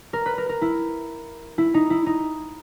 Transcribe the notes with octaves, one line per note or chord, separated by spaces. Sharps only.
A#4
B4
A#4
A#4
E4
E4
D#4
E4
D#4